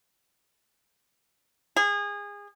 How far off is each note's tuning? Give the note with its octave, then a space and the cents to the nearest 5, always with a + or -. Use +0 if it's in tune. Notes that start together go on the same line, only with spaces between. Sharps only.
G#4 -25